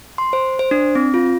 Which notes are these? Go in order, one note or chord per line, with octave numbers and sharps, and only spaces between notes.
C6
C5
C5
D4
C4
F4